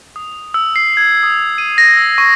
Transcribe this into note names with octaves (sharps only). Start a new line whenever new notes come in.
D#6
E6
C7
G#6
D#6
D#7
A#6
E6
C#6